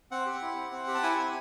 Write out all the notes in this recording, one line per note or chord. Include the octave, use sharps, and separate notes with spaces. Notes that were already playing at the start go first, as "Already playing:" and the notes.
C4 F#5
G4
E4
C4
C4
G4
A5
E4 G#5
C4